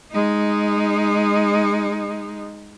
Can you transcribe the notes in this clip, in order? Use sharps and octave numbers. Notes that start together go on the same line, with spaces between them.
G#3 D#4